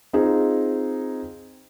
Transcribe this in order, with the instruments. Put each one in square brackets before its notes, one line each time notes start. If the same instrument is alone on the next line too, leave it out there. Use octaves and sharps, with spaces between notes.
[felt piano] C4 D#4 F4 G#4